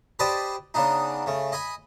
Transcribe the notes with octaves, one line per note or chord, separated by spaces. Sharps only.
G4 B4 C5 D5 D#5 A5
C#3 B3 D4 D#4
C#3 A3
D#5 G#5 B5